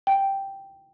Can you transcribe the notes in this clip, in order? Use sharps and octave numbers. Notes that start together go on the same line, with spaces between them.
G5